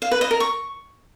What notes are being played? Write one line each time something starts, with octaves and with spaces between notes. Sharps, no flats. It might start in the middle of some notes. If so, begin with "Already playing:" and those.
F5
B4
D#5
A#4
C#6